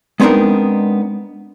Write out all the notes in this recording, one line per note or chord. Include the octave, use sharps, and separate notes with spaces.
G#3 B3 C4 D4 D#4 A#4